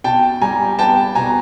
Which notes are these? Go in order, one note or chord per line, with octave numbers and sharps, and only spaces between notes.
B2 G5 A5
G3 G#5 A#5
B3 G5 A5
B2 G#5 A#5